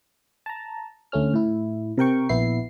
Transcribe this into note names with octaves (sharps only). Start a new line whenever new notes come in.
A5 A#5
D2 A3 C#4 F6
A2 E4
C3 A#4 G5 C#6
A#1 B3 E4 C7